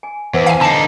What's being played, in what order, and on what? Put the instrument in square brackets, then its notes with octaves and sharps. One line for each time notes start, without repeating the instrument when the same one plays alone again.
[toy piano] G#5
[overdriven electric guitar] E2 [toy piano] B4 C5 F#5
[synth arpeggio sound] F5 G#5
[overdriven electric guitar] D3 D#4 [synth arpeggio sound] A5 C7